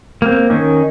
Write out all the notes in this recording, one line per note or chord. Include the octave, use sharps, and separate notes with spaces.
A#3 C4
D#3 C#4 D#4